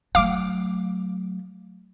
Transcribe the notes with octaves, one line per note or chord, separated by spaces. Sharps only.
F#3 A3 F5 D6